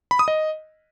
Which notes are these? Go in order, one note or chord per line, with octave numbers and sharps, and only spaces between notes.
B5
D#6
D#5